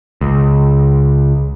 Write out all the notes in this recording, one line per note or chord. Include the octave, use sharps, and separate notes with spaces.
C#2